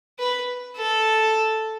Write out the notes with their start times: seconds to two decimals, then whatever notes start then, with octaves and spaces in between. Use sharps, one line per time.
0.19 B4
0.77 A4